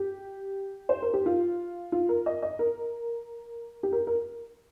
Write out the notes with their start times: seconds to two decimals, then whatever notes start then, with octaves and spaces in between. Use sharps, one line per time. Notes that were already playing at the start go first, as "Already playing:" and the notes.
Already playing: G4
0.89 C5
1.02 A#4
1.14 G4
1.26 F4
1.92 F4
2.09 A#4
2.26 D#5
2.42 D#5
2.59 A#4
3.83 G4
3.92 A#4
4.07 A#4